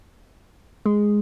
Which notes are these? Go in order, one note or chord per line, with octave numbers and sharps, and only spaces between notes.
G#3